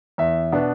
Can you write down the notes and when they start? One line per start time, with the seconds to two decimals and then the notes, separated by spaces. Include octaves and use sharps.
0.18 E2 E5
0.52 B2 B3 D4